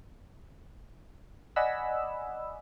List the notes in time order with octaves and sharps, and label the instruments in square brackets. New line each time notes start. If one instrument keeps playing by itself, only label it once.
[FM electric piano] D5 D#5 F#5 G#5 B5 E6